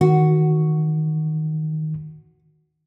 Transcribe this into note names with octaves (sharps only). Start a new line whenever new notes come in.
D#3 F#4